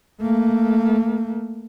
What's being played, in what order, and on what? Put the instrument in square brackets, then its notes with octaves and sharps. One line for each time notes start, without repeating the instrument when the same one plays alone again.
[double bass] A3 A#3